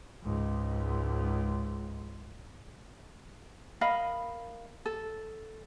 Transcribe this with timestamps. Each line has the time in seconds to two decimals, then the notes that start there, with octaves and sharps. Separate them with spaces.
0.23 C#2 G#2
3.81 A#4 D#5 F5 B5
4.86 A4